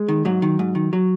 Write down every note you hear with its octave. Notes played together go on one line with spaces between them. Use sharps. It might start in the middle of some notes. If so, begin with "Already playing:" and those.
Already playing: G#3
D#3
G#2 F#3
D#3
G#2
D#3
F#3